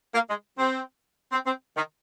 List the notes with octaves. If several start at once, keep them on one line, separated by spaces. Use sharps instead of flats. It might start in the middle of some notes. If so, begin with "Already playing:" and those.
A#3
G#3
C4
C4
C4
D#3